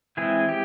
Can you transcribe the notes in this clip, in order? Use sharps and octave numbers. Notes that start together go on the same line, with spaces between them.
E3 G#3 C4 E4 G#4
G4